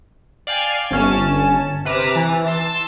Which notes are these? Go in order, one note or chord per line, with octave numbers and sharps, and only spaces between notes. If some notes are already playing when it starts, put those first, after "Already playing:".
D5 F5 G5 G#5
G1 C#4 A5
C3 B4 A#5 D6 F6 E7
E3 A6
A5 C6 E6